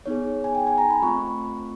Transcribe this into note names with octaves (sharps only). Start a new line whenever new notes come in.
B3 D#4 G#4 C#5
G#5
G5
G#5
A#5
B5
A3 C4 F4 C#6